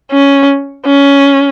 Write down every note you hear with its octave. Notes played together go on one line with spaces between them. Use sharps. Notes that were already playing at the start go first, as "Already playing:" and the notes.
C#4
C#4